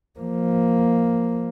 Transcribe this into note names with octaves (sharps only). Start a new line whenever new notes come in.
F3 A#3